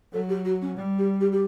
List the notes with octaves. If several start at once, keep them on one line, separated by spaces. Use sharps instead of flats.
F#3 A4
G4
F#4
C#4
G3
G4
G4
G4